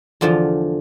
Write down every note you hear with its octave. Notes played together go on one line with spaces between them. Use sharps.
E2 D3 F3 F4